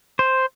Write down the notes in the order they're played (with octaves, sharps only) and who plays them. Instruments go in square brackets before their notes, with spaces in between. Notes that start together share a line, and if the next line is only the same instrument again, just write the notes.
[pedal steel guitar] C5